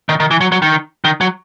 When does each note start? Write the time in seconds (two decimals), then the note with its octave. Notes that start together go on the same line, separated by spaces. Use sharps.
0.09 D#3
0.20 D#3
0.31 E3
0.41 F#3
0.52 F#3
0.62 D#3
1.05 D#3
1.21 F#3